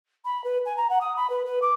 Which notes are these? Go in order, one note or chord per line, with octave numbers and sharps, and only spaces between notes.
B5
B4
G#5
A#5
F#5
D#6
B5
B4
B4
D6